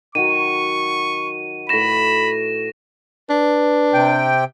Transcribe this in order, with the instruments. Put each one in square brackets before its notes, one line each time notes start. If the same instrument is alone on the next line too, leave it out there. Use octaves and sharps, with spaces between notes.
[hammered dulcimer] D#3 F#3 F#4 [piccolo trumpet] C#6 [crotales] D#7
[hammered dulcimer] A2 B4 C#6 [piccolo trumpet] B5 [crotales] A#6 E7
[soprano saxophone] D4 [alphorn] B4
[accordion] C3 G5